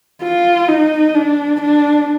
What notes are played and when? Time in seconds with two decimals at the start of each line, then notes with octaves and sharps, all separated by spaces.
0.22 F4
0.68 D#4
1.15 D4
1.61 D4